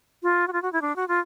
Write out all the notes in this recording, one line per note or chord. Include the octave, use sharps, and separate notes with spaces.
F4
F#4
F4
F#4
E4
D4
F#4
F4